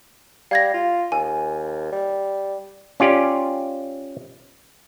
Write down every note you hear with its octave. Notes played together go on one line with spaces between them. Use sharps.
G3 F5 G#6 A#6
F4
D#2 G#5
G3
C#4 F4 G4 D5